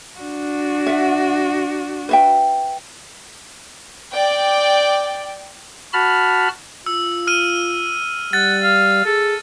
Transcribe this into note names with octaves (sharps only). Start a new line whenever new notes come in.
D4 F#4
E5 F#5
B4 E5 G5
D5 G5
F#4 A5 B5 F6
F4 E6
F6 D#7
G3 F#5 A6
F5
G#4 A4